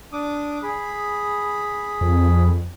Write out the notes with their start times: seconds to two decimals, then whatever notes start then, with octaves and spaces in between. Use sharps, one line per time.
0.13 D4 D6 D#6
0.63 G#4 B5
2.01 F2